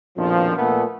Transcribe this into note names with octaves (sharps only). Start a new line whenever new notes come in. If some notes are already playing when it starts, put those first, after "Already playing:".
A#1 F2 B2 D#3 F3
A#2 A3 B3